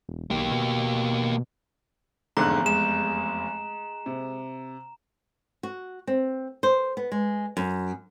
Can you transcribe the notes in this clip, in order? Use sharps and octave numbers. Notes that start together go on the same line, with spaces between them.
E1
B1 A#3 G4
B2
F1 E2 G#2 D3 A#5 F#6
G#3 E7
C3
F#4
C4
C5
B3
G#3
F#2